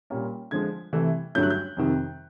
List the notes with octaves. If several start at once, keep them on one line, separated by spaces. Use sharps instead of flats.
A#2 G3 A#3 C#4
D3 F3 G#3 G#6
C3 E3 A3
G2 D3 F#3 A3 C#4 G6
F#6
G6
F2 C3 D#3